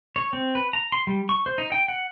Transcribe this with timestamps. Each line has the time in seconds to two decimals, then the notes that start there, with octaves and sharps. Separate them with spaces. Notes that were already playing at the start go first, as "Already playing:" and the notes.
0.16 C#5
0.33 C4
0.55 B4
0.73 A#5
0.92 C6
1.07 G3
1.29 C#6
1.46 C5
1.58 D#4
1.72 G5
1.88 F#5